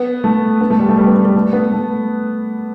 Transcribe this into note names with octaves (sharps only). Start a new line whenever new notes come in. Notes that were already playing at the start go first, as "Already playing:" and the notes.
Already playing: B3
A3
B3
A3
G3
A3
G3
B3
A3
G3
A3
B3
A3